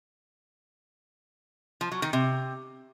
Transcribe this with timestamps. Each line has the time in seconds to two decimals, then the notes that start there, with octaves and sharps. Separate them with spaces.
1.81 F3
1.92 F#3
2.02 D#3
2.13 C3